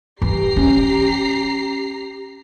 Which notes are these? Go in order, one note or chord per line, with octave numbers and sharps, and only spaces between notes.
E3 G4 A#5 C7
C#4